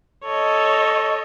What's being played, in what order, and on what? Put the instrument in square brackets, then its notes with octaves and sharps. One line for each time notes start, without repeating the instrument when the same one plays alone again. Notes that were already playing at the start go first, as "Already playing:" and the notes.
[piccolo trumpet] A4 [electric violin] C#5 D#5